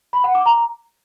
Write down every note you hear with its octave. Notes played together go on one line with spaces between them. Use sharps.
B5
F#5
D6
A#5